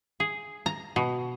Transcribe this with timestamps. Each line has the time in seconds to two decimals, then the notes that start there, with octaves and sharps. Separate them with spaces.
0.20 G#4
0.66 A#5
0.96 B2